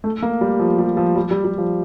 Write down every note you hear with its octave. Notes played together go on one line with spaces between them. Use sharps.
A3
A#3
G3
F3
G3
F3
G3
G3
G3
F3